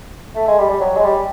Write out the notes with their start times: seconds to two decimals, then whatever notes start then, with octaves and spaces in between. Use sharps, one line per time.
0.36 A3
0.47 G#3
0.58 G3
0.70 G3
0.81 F#3
0.97 G#3
1.04 G3